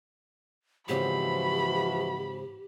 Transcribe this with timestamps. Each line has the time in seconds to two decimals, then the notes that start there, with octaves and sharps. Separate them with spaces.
0.89 G#2 C#3 E3 F3 C4 F#4 G4 B5